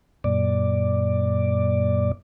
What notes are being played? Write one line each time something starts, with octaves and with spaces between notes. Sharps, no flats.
F#2 A#2 D5